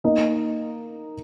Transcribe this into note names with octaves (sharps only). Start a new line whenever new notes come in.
A#3 D#4 A#4 D#5